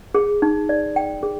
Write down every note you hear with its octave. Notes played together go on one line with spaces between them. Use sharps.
G#4
D#4
D5
G5
G#4